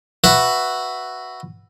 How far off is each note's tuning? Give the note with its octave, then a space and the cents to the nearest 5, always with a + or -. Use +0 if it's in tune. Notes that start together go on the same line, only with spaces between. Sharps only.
F#4 +0 B4 +0 E5 +0